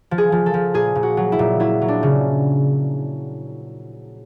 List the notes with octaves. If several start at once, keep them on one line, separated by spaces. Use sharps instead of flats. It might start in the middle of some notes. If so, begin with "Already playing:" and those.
F3
G#4
F3
A4
F3
A#2 G#4
A#2
F#4
F#3
E4
A#2
F#3 E4
F#3
D4
C#3